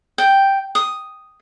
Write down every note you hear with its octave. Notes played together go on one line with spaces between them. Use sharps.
G5
D#6